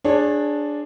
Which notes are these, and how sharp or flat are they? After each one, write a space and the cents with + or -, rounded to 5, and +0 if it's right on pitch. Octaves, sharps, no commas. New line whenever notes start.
D4 +0 G#4 +5 C#5 -30